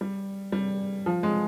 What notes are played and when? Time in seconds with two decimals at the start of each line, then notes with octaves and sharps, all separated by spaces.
0.01 G3
0.52 G3
1.06 F3
1.23 G#3